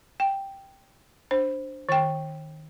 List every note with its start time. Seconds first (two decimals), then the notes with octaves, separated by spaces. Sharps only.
0.20 G5
1.31 D4 C5
1.89 D#3 G5